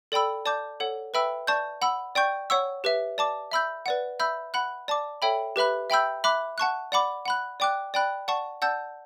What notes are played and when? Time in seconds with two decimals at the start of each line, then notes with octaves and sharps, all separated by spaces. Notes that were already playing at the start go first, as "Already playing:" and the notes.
0.12 A4 D5 G5 B5 E6
0.45 D5 A5 D6 G6
0.80 A4 C#5 F#5
1.14 B4 E5 G5 B5 E6
1.47 D5 A5 C#6 G6
1.82 F#5 B5 E6
2.15 D5 G5 C#6 G6
2.50 C#5 F#5 C#6 E6
2.84 G4 B4 E5
3.18 D5 A5 D6
3.51 E5 B5 E6 G6
3.86 B4 D5 F#5
4.20 E5 B5 E6 G6
4.54 F#5 B5 F#6
4.88 D5 A5 D6
5.22 A4 C#5 E5 G5 B5
5.56 G4 B4 E5 B5 F#6
5.90 E5 G5 B5 E6 G6
6.24 E5 B5 D6 F#6
6.58 F#5 A5 C#6 F#6
6.92 D5 F#5 B5 D6
7.25 F#5 B5 F#6
7.60 D5 G5 D6 F#6
7.94 D5 G5 B5 F#6
8.28 D5 F#5 A5 C#6
8.62 D5 F#5 A5 E6 G6